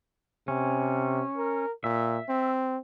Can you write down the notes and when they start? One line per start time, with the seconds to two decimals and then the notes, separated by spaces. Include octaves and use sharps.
0.48 C3 C#4
1.37 A#4
1.84 A#2 E5
2.29 C4